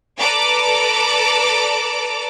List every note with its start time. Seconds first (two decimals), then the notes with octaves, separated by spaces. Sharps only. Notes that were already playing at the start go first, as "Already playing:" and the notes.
0.19 A4 B4 D5 A#5 D6